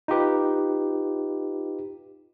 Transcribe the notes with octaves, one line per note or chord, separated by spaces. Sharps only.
D#4 F4 G4 B4